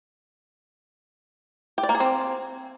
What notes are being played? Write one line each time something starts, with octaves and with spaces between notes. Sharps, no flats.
G4
D5
A#3
G#4
C4